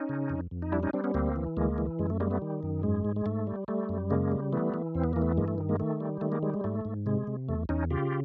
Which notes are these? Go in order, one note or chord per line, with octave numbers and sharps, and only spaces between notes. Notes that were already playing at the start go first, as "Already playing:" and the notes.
Already playing: C#4 D#4
C#3
F2
F2
D#4
G3 D4 E4
C#4 D#4
G3 C4 D4
B3 C#4
D2 A#3 C4
E3
D2 G#3 A#3
E3
F#2 G#3
A3
G3 G#3 A#3
A3 B3
D#3
F#2
G#2 G#3
G#2
G#3
G#2 A3
G3
G3 A3
F#2
C#3 G#3 A#3
G3
E3 A3 B3
E3
E2 C4
B3
E3 A#3
A3 B3
G2 G#3 A#3
A3
D#3
G#3 A#3
D#3 A3
G3
D#3 A3
G#3 A#3
G3 G#3
G#3
G#2 A3
G#2
C3 G#3
C3
E2 A3
E2 C#4 D#4
C#3 F4 G4